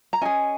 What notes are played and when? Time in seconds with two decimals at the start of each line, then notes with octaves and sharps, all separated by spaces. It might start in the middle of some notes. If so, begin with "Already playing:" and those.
0.13 A#5
0.21 C#4 G#4 D#5 G#5